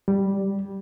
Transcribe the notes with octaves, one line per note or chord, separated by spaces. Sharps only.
G3